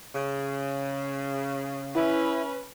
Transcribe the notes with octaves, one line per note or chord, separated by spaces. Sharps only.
C#3
C#4 E4 B4